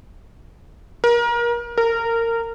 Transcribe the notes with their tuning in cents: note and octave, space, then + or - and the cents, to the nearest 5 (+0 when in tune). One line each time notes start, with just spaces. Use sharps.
A#4 +30
A#4 -20